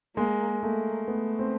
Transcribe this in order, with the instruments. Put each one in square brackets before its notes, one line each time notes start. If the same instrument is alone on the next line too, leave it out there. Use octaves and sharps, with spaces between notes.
[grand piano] G#3 [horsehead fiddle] A#3
[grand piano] A3 [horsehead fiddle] A#3
[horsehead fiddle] A3 [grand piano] B3
[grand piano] C4